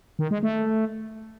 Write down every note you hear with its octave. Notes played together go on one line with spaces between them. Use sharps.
D#3
G#3
A3